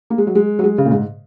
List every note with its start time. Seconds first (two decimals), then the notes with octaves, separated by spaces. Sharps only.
0.10 A#3
0.18 G#3
0.27 F#3
0.35 G#3
0.59 F#3
0.64 G#3
0.78 C#3
0.85 A#2
0.91 G#2